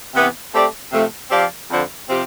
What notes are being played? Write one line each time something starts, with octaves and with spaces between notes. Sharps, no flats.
C3 E3 B3
A3 C4 G4 D5
C3 F3 A3
F3 C4 G4 D5 F5
F2 D3 F3
C3 F3 C4 G4